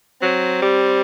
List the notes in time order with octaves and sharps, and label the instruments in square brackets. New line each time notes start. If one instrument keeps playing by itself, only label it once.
[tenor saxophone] F#3 [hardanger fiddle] C4
[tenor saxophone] G3